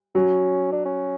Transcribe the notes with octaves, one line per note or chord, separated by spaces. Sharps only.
F#3 C#4
D4
C#4